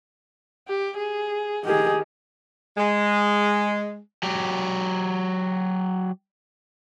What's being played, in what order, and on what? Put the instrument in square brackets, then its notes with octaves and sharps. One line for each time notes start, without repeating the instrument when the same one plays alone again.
[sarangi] G4
G#4
[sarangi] D#3 [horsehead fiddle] G4 G#4
[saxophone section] G#3
[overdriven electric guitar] F#3 G4